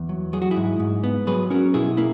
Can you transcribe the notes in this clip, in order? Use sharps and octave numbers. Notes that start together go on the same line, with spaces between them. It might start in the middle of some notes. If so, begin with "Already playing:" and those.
Already playing: E2
F#3
F#3 G#4
F#4
E4 G#4
G#2
G#2
B3
F#3 G#4 B4
C#4 F#4 A#4
B2 E4 G#4
A#3 E4